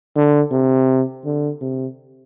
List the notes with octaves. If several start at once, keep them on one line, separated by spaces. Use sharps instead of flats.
D3
C3
D3
C3